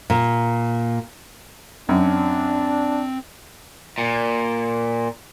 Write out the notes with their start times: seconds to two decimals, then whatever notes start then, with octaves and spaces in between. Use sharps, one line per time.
0.10 A#2
1.89 F#2 C4 D4
3.98 A#2